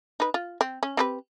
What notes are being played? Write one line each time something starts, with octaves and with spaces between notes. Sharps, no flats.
D#4 B4
F4
C4
C#4
C4 G4 B4